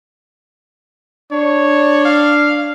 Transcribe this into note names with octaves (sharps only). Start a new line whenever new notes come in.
D4 C#5
F5